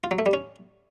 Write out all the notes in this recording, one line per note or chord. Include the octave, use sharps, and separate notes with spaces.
F4
F#3
A3
G3
C#4